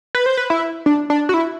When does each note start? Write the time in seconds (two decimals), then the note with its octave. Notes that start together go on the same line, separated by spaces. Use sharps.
0.15 B4
0.26 C5
0.37 B4
0.50 E4
0.86 D4
1.10 D4
1.29 F#4
1.34 E4